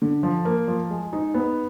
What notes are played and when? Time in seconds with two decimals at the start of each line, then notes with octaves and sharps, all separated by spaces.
0.02 D3
0.23 F3
0.45 A#3
0.68 F3
0.90 G#3
1.13 D#4
1.34 B3